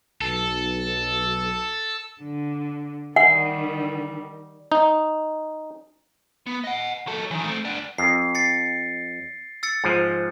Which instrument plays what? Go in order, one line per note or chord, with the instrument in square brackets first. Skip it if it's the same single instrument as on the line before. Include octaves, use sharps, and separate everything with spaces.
[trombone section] B1 [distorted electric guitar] A4
[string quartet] D3
[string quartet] D#3 G3 [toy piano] F#5
[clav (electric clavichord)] D#4
[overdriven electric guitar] B3
D#5 F#5
F#3 A4
D#3 E3
A3 C4
B3 D4
[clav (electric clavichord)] F2 [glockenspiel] C7
[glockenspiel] A6 C7 C#7
E6 A6 C#7
[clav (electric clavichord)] G#2 F3